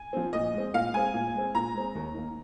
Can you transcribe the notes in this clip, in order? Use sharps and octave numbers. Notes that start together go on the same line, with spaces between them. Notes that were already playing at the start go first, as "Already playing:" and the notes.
Already playing: G#5
F3 C4
A#2 D#5
G#3 C4
A#2 F5
G#3 C4 G#5
A#2
G#3 C4
A#2 A#5
G#3 C4
D#2
D#3 A#3